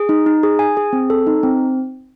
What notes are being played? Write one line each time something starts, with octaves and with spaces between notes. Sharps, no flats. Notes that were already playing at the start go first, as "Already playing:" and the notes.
Already playing: G#4
D#4
D#4
G#4
G#5
G#4
C4
A4
D#4
C4